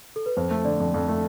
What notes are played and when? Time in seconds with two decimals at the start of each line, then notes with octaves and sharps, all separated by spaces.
0.16 A4
0.26 B4
0.37 F2 C5
0.51 A3
0.65 D3 D5
0.80 F2
0.94 F2
1.08 A3